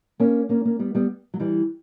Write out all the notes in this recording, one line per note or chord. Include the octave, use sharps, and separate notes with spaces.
A#3 C#4
A#3 C#4
A#3 C#4
G3 B3
G3 B3
F#3
E3 G3